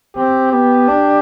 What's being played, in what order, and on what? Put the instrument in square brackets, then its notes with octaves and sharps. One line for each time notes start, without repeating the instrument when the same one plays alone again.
[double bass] C4 [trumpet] G4
[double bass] B3 [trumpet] G4
[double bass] D4